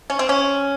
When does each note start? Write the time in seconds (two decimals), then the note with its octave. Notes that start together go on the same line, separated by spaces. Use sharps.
0.10 C#4
0.19 C4
0.29 C#4